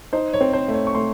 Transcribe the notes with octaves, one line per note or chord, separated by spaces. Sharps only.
D#4 C5
C#5
C4
C5
A3
C#5
C#6
A3 C6